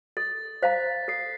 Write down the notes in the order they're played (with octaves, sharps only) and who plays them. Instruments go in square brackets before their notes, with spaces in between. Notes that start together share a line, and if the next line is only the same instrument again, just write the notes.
[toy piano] A4 [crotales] A6
[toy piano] C5 F5 A#5 [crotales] B6
[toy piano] A4 [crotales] C7